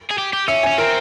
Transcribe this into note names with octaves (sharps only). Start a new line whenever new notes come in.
G#4
G4
G4
C#4 E5
C#4 G#5
C4 A#4